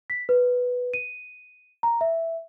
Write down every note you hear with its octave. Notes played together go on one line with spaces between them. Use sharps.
B6
B4
D#7
A#5
E5